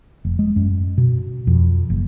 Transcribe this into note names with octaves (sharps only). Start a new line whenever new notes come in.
F1
G#3
F#2
B2
F2
F#1